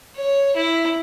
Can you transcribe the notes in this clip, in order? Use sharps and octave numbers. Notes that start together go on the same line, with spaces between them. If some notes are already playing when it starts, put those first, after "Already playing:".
C#5
E4